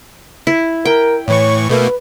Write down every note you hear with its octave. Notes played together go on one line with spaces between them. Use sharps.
E4
A#4 G5
A2 E3 C#5 C#6
B2 A3 A#3 B4